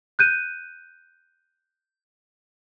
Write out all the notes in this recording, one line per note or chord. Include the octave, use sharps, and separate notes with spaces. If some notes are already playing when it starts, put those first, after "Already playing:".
F#6 G6 D#7